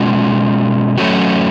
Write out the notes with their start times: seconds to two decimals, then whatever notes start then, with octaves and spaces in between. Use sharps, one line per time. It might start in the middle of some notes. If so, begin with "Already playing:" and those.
Already playing: B2 G#3 C#4 F4
0.98 F#3 A3 C#4 F#4